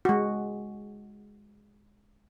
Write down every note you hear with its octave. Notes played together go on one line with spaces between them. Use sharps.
G#3 F#4